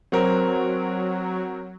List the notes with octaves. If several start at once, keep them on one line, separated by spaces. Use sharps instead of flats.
F#3 C4 A#4